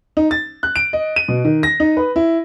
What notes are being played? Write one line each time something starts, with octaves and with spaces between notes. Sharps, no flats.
D#4
A6
F#6
D7
D#5
D#7
B2
D#3
A#6
D#4
B4
E4